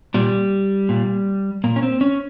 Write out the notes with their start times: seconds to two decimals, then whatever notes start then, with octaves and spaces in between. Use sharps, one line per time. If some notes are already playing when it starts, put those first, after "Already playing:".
0.14 A#2 G3
0.89 A#2
1.64 A#2 A#3
1.76 C#4
1.83 C4
2.01 C#4